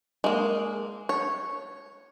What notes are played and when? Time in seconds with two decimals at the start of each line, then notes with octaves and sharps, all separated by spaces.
0.24 G#3 A#3
1.09 C#5